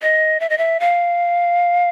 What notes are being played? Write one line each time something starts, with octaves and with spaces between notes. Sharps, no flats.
D#5
E5
D#5
E5
F5